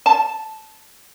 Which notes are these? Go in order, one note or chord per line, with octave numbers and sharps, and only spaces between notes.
A5